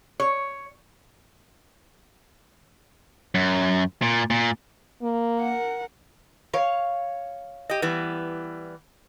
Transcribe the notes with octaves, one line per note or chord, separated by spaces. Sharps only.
C#5
F#2
A#2
A#2
A#3
A#4 F#5
C#5 F5
G4 D#5
E3 G3 B3